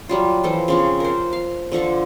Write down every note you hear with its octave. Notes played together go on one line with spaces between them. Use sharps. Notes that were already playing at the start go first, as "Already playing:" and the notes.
F#3 G3 F4
E3 F3 A4 G5
C#3 F3 C4
A#4 C5
F5
D3 F3 A4 C#6